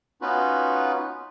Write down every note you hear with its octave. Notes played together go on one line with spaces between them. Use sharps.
B3 C#4 D#4 F4 F#4 B4